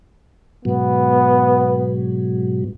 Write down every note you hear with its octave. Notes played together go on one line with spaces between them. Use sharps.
G#2 B2 F#3 B3